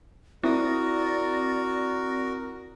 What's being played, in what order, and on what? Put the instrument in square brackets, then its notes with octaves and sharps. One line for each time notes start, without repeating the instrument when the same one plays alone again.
[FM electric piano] C4 D#6 A#6 [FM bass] E4 [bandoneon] F#4 A#4 [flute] D5